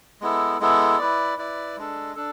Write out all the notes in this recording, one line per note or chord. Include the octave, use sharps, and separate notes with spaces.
G#3 B3 E4 A4
G#3 B3 E4 A4
E4 B4 D5
E4 B4 D5
G#3 D4 A4
D4 A4